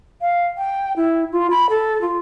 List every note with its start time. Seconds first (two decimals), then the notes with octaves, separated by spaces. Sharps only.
0.21 F5
0.57 G5
0.96 E4
1.32 F4
1.51 B5
1.70 A4
2.01 F4